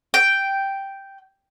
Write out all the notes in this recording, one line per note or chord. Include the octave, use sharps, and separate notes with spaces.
G5